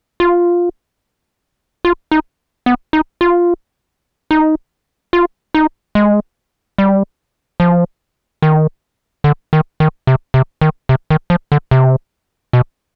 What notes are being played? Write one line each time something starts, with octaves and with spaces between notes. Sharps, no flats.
F4
F4
D#4
B3
D#4
F4
D#4
F4
D#4
G#3
G3
F3
D#3
D3
D#3
D#3
C3
C3
D#3
C3
D#3
F3
D3
C3
B2